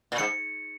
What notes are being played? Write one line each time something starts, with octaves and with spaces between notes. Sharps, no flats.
A#2
G#2 C#7